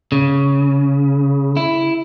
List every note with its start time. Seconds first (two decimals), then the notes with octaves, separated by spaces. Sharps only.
0.12 C#3
1.57 E4